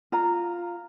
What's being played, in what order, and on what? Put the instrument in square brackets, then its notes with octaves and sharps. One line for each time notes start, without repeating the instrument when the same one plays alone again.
[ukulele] F4 A#5